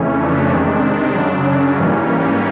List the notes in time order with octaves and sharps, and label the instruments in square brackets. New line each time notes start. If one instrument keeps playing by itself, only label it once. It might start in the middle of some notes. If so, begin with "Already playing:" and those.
Already playing: [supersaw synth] F2 C#3 E3 A3 C#4
D4
C3 D#3 G#3
F#2 C#3 F#3
C#4
G#2 E3 G3 A#3